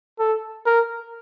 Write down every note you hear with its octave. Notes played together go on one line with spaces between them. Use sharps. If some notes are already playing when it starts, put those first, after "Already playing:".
A4
A#4